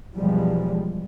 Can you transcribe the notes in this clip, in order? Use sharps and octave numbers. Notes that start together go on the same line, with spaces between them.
B1 E2 F3 G3 G#3